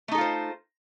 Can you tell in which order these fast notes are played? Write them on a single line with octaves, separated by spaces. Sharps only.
A3 D#4 A4 F4 C5